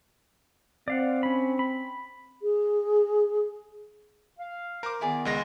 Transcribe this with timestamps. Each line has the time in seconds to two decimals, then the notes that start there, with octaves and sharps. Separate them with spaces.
0.88 C4 D5 F5 F#5
1.23 C#4 B5
1.59 B5
2.42 G#4
4.39 F5
4.83 A#4 C5 D6
5.01 D#3 B3 E4 G#4 D5
5.25 C#2 G#3 A#6